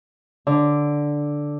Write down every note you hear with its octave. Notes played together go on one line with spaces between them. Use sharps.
D3